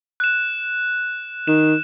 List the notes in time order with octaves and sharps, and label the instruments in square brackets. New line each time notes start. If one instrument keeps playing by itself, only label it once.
[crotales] F#6 E7
[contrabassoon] D#3 [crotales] E7